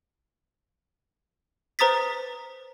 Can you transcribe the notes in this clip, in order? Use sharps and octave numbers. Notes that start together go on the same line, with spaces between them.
B4 C5 A#5 D#6 A6 B6